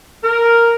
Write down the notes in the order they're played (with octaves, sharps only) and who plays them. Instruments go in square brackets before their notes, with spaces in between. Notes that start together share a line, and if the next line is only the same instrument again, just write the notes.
[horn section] A#4